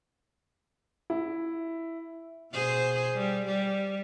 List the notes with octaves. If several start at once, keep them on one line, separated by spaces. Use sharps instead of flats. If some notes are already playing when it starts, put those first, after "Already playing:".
E4
B2 G#4 C5
G3
G3